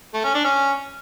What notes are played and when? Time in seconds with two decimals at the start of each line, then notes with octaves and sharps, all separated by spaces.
0.14 A3
0.24 C#4
0.34 D4
0.45 C#4